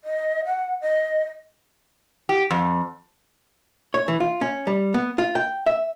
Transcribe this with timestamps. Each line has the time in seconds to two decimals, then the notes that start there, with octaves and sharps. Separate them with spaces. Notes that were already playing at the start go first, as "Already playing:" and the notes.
0.04 D#5
0.45 F#5
0.81 D#5
2.29 G4
2.51 F2
3.94 C#5
4.08 E3
4.20 F4
4.41 C#4
4.67 G3
4.94 B3
5.18 F4
5.35 G5
5.66 E5